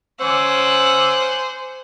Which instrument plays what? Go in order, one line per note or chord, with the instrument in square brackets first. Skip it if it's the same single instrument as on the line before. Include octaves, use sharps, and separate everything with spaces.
[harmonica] C#4 D6 E6 [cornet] C5 [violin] F#5 G#5